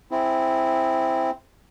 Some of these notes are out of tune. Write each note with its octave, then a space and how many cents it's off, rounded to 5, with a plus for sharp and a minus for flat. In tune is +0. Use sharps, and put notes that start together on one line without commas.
C4 +0 E4 +0 G#4 +5